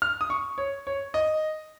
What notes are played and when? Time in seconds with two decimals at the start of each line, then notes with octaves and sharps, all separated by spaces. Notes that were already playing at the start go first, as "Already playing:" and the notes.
0.02 F6
0.21 D#6
0.30 C#6
0.58 C#5
0.87 C#5
1.14 D#5